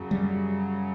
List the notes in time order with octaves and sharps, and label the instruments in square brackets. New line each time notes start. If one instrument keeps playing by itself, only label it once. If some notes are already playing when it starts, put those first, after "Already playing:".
Already playing: [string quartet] F#2 C#3 F#3
[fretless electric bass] G3